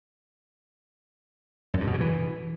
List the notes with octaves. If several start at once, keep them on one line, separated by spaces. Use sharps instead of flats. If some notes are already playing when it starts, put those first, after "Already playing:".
F#2
G2
B2
C#3
E3